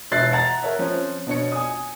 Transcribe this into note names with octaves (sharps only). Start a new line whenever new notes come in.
E1 C#5 E5 F#6 A6 C7
F#5 A5 A#5 A6
A#4 C#5 E5
F3 C4 C#4
B2 D4 C#5 C#7
G#5 D#6